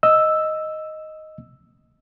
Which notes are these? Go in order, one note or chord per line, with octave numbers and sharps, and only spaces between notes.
D#5 E6